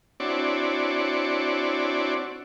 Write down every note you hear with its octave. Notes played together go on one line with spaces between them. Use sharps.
C4 D4 E4 F#4 C#5 D5